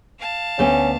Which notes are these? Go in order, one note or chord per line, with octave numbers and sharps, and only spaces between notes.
F5 A5
D2 A3 B3 C#4